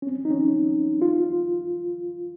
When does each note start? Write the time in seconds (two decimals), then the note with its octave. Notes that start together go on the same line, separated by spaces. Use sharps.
0.02 C#4
0.07 C4
0.25 D#4
0.31 C#4
1.02 F4